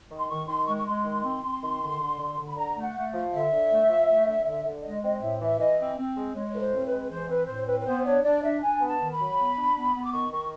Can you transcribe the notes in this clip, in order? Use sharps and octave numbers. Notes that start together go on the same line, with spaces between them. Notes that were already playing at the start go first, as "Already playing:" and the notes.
D#3
C6
D#3 C#6
D#3 C6
G#3 C#6
C#6
G#3 C6
D#3
C4
C4
D#3
D3
D3
D3
D3
B5
D3 A#5
A3
F#5
A3
F3
D3 E5
D3
A3
F3
A3
D3
D3
D3
G#3 D#5
C4 D#5
A2 E5
E3 E5
E3 D#5
C4
C4
G#3
G#3 C#5
A2 B4
C5
C4 A#4
B4
G#3
E3 C5
C4 B4
A2 C5
C4 B4
B4
B3 C5
D4 C#5
D4 D5
D4 E5
D4 G#5
B3
A5
D#3
B5
F#3
B3
D4
B3
B3
D6
D#3 C#6
D#3 C#6